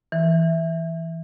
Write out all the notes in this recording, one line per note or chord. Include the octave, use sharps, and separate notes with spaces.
E3